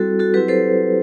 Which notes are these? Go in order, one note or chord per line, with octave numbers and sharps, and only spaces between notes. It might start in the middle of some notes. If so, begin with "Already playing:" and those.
Already playing: G3 C4 E4 F#4 A4
F#4 A4
F#3 C4 E4 G4 B4
A4 C5